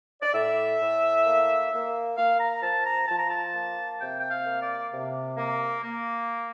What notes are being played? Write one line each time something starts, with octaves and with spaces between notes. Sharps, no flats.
D5
A2 E5
A2
A#3
A#3
A#3 F5
A#5
F3 A5
A#5
F3 A5
A#5
A5
A#3
C3 G5
G5
F5
A#3
D5
C3
A#3
A#3